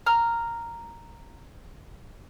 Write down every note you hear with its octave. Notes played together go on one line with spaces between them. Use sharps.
A#5 F6